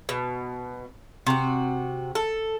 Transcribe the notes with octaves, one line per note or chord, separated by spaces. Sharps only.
B2
C3 F#4
A4